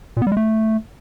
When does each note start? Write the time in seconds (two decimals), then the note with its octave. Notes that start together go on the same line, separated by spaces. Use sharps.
0.17 A#2
0.22 B3
0.27 G3
0.32 G#3
0.37 A3